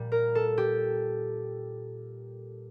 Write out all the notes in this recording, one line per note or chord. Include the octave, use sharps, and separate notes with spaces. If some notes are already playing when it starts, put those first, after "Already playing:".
Already playing: A#2 G3
A#4
A4
G4